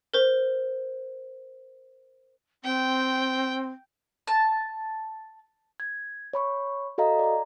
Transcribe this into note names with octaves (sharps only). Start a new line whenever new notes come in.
A#4 C5
C4 G5
A5
G#6
C#5 B5 C#6
F#4 A4 D#5 F5 A#5
D5 A#5